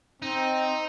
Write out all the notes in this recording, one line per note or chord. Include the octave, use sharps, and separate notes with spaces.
C4 D#4